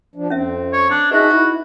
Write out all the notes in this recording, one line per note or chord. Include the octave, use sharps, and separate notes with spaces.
F3 D4
F2 C4 C#4 E5
C#5
D4
D#4 F#4 G#4 B4 D#5 E5
E4 D#5 D6